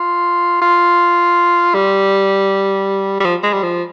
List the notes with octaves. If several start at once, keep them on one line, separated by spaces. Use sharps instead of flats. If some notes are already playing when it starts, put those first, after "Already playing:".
Already playing: F4
F4
G3
G3
F3
G#3
G3
F3